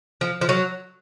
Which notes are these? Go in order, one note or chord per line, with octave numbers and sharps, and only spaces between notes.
F3
F3
F#3